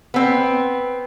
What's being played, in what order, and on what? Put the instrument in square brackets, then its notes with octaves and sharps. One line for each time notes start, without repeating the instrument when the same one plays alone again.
[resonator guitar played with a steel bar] B3 C4